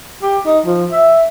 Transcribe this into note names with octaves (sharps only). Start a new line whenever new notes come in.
G4
D#4
F3
E5